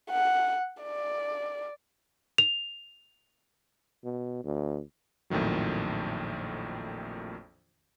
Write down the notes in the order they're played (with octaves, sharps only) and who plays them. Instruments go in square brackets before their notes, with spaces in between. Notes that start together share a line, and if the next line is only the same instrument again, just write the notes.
[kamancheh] F#5
D5
[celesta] F7
[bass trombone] B2
D2
[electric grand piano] A#1 F2 A2 D#3 F#3